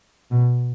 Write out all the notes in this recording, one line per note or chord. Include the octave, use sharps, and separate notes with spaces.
B2